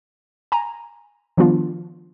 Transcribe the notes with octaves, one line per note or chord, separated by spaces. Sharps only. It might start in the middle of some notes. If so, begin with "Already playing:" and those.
G#5 A#5
D#3 F3 G3 B3 D4 F4